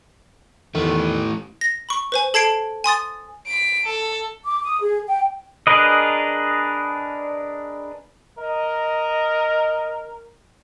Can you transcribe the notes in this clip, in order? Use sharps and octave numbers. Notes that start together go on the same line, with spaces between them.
E2 D#3 E3 A3
A#6
B5 C#6
B4 C5 G#5
A4 A5 G#6 C7 D7
G#5 C6 D#6 A6
B6 D7
A4
D6
D#6
G#4
G5
D4 G#4 A#4 B4 D#5
A#4 D#5